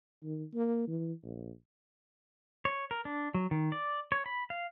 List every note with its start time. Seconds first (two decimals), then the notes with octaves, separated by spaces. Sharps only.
0.23 D#3
0.54 A#3
0.88 E3
1.23 A#1
2.65 C#5
2.91 A#4
3.05 D4
3.34 F#3
3.51 D#3
3.72 D5
4.12 C#5
4.26 B5
4.50 F5